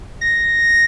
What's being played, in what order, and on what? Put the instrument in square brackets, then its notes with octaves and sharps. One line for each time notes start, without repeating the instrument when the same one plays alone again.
[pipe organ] A#6